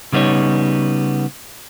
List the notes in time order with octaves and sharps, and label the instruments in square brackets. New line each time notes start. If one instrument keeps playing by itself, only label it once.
[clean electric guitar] C#3 G3 B3 D#4 C#5